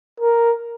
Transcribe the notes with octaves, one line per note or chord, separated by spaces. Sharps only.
A#4